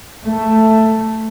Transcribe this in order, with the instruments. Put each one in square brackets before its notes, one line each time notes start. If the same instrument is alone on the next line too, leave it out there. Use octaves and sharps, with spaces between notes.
[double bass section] A3